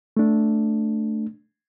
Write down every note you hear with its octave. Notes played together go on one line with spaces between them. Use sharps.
A3 D4